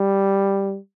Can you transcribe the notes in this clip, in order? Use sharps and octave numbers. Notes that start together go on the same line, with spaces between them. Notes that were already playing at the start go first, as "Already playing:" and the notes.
Already playing: G3